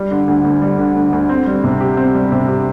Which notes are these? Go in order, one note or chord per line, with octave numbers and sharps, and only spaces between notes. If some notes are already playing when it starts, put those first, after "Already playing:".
Already playing: G3
D3
D2
D2
G3
D3
D2
D2
C4
G3
C3
G4
C4
G3
C3
G4